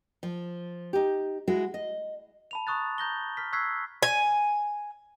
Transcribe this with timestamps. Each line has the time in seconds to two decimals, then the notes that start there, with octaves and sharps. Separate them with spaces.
0.23 F3
0.93 D#4 G4
1.48 G#3 E4 F#4
1.74 D#5
2.51 A5 B5 F7
2.67 A#5 C#6 D#6 F#6 A6
2.98 A#5 G6 A#6 G7
3.37 F6 B6
3.53 C#6 E6 F#6 G#6 B6 C7
4.03 G#5